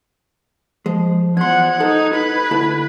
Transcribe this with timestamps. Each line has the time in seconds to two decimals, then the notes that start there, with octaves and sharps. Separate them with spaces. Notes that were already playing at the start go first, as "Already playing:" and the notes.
0.86 F3 G#3
1.37 E2 F3 F#5 C6 G#6
1.80 D#4 A4
2.14 B4
2.51 D2 E4 A4